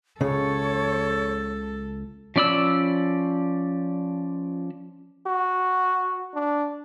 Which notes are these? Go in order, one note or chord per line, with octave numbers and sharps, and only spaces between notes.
C#2 C#3 A4 C#5
F3 C#4 D5 B5 E6
F#4
D4